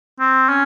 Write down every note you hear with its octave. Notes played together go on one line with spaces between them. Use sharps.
C4
C#4